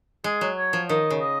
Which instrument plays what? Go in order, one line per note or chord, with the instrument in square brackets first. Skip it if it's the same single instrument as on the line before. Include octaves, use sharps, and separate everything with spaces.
[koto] G#3 [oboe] G#4
[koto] F#3
[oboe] C#5
[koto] F3
[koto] D#3 [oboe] D#5
[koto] C#3
[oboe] D#5